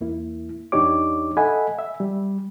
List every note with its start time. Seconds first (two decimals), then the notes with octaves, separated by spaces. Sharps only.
0.01 E2 A#3 E4
0.72 E2 D4 D#4 G4 C#5 D6
1.37 A4 D#5 E5 F#5 G#5 B5
1.79 E5
2.00 G3